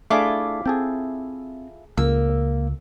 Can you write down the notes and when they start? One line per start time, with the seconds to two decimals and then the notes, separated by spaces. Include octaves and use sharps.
0.10 A3 D4 E4 F4 G#4 D6
0.66 C4 G#4 A4 G5
1.98 C#2 A#3 E6